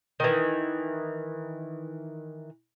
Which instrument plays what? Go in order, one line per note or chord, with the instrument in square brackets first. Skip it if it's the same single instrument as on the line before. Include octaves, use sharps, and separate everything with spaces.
[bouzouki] D#3 E3